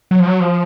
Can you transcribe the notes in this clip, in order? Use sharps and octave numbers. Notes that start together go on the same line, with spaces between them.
F#3
F3
F#3
F3